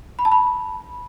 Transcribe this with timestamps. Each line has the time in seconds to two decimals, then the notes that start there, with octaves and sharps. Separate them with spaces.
0.19 B5
0.25 A5
0.32 B5